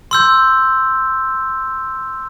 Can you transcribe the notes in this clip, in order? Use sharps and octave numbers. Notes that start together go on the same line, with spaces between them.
C6 E6 G6